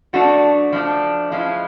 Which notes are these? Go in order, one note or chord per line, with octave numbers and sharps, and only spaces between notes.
F3 A3 D4 F#4
F3 A3 D4
A2 F3 G#3 C#4 E4 F4